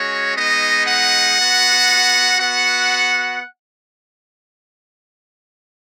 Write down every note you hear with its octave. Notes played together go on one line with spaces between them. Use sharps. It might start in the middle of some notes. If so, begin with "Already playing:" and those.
Already playing: G#3 C#4 F#4 C#5
G#3 B3 D#4 D#5
F#5
B3 F#4
B3 F#4 F#5